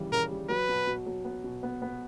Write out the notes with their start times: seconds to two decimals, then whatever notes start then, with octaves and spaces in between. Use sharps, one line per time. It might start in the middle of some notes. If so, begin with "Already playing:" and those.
Already playing: D#2 C#3 E3 G3
0.12 C#3 A#4
0.31 G3
0.49 F#3 B4
0.69 B2
0.87 B2
1.06 F#3
1.25 B3
1.44 B2
1.63 B3
1.82 B3